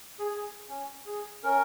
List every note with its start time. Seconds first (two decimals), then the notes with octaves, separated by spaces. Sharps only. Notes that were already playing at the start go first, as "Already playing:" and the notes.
0.19 G#4
0.31 G#4
0.69 C#4
1.06 G#4
1.43 C#4 A#4